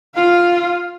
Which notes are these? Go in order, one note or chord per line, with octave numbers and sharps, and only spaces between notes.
F4 F5